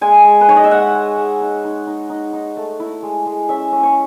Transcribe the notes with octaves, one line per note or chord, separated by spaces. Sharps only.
G#3 G#5
G#3
B4
D#4 C#5
D#5
E5
G#3 F#5
G#3
G#3
D#4
D#4
D#4
D#4
D#4
A3
E4
G#3
G#3
C#4 E5
C#4
C#5